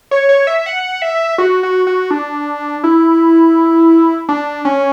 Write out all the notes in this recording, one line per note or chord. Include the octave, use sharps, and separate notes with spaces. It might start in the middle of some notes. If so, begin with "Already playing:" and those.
C#5
C#5
E5
F#5
E5
F#4
F#4
F#4
D4
E4
D4
C#4